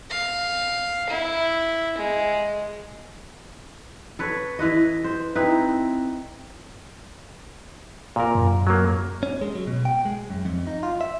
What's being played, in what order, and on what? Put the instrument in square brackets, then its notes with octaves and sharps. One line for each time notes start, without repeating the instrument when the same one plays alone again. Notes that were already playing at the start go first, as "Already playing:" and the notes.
[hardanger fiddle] F5
E4
G#3
[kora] A4 B4 C#5
E3 E4 B4 D#5
C5
C4 D#4 E4 B4
[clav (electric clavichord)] A#2 A#4
[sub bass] F#2
[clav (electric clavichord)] F#3 A#3
[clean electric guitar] C#4
G#3
F#3
B2
G5
G#3
F#2
F2
D#4
F4
E5